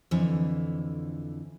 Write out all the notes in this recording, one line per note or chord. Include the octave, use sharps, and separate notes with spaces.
F2 D3 E3